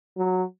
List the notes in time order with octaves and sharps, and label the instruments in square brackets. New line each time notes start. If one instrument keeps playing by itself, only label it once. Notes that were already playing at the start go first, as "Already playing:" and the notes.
[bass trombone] F#3